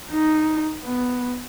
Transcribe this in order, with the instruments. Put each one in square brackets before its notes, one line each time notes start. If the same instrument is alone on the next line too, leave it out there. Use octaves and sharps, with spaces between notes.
[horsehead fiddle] D#4
B3